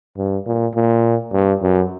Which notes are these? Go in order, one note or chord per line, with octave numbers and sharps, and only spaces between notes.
G2
A#2
A#2
G2
F#2